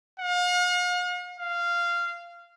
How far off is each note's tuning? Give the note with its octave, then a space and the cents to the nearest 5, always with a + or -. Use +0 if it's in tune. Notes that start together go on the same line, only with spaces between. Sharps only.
F5 +45
F5 -15